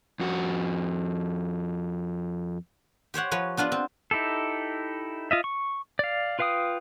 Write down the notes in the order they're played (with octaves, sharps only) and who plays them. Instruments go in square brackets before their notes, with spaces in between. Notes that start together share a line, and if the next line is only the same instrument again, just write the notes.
[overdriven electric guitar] F2 F#4
[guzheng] G4 C5 C#5 F#5
F3 B4 C#5
B3 D4 F4 B4
C4
[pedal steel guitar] D#4 E4 G4 A4
F4 D#5 E5
C#6
D5 F5
F4 B4 F5 G5 D#6